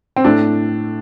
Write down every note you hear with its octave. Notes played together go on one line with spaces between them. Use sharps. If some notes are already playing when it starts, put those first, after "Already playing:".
C4
A2 A3 D4